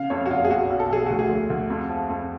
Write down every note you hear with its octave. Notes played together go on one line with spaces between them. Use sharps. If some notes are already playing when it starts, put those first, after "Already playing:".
Already playing: C#3 F5
F2 C#5
F#4
F#1 F4
G#4
B1 F#4
B1
A4
B1 G#4
D2 F#4
G#4
D2
D2
F2
F3
F2